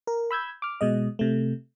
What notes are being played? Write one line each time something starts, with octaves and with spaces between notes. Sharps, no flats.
A#4
B5 E6 G6 G#6
D6 F6
B2 G#3 D#5
C3 A3